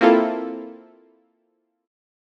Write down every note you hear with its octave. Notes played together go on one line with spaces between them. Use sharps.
A#3 C4 E4 F4 A4